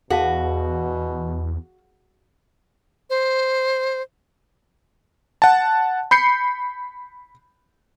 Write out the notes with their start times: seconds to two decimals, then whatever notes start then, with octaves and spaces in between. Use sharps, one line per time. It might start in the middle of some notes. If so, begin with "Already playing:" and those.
0.10 E2 B2 F#4 G#4 F5 A5
3.10 C5
5.42 F#5 A5
6.11 B5 G6 C7 C#7